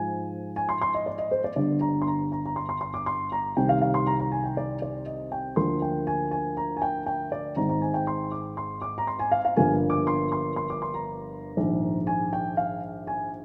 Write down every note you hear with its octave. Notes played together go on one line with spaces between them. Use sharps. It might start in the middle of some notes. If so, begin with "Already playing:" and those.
Already playing: G#2 F3 G#3 G#5
G#5
C6
C6
D#5
D5
D#5
C5
D5
G1 G2 D3 D5
A#5
C6
A#5
A#5
A#5
C6
C6
C6
D6
C6
A#5
C2 C3 D#3 G3 G5
F5
F5
C6
A#5
A#5
G#5
G5
D5
D5
D#5
G5
D2 D3 F3 A#3 D4 C6
G5
G#5
G#5
A#5
G#5
G5
G5
D5
G#1 G#2 D#3 A#5
A#5
G#5
G5
C6
D6
C6
D6
A#5
C6
G#5
F5
F5
G1 G2 F3 A#3 G#5
D6
C6
C6
C6
D6
C6
A#5
A#1 G#2 D#3
G#5
G5
F5
G#5